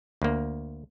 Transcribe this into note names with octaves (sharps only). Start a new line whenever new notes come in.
D2 A#3